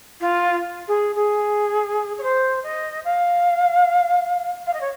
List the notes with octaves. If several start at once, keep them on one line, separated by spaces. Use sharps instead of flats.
F4
G#4
G#4
C#5
C5
D#5
F5
F5
D#5
C#5